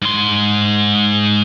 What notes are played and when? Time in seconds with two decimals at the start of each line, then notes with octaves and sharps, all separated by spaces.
0.02 G#2 C6